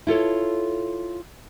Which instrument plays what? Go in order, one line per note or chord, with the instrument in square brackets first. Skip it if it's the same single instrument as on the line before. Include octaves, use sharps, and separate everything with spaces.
[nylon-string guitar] E4 F4 A4 C#5